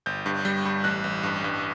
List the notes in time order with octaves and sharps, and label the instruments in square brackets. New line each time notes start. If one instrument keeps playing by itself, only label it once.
[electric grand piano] G1 G6
G2
G3 G6
G3
A1 F#6
A1
G2
G2